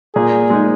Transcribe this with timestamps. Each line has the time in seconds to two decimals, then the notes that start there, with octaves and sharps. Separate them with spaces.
0.15 A#2 G#4
0.50 G#3 D#4